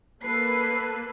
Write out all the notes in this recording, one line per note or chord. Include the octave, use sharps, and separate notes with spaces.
A#3 A4 B4 C7